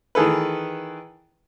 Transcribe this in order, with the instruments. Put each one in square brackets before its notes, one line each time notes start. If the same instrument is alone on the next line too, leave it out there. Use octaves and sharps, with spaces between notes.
[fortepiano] D#3 E3 G#4 A4 B4